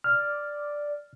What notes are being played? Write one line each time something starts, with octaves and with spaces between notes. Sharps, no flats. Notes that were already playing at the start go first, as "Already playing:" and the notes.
D5 F6